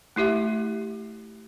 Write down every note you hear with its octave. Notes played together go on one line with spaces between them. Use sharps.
A3 E4 G4 E5